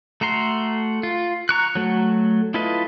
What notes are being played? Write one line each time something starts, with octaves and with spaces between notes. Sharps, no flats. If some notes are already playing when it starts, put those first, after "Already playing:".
A3 F#4 A#5 C6
F4
A#5 C#6 F#6
F#3 A3 F#4
E4 F4 A4 B4 D#5